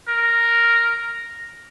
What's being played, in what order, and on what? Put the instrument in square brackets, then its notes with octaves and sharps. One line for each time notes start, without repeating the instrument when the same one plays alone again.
[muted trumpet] A#4